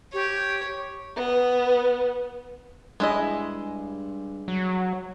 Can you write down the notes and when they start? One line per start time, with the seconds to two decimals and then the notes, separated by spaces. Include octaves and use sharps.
0.14 G4 C#5
1.16 B3
3.00 G2 G#3 E4 D#5
4.48 F#3